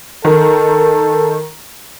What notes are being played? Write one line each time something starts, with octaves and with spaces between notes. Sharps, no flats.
D#3 A4